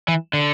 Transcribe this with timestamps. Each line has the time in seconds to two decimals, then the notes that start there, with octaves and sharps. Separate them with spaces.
0.08 E3
0.33 D3